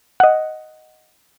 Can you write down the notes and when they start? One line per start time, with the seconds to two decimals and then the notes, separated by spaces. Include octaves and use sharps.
0.20 D#5 F#5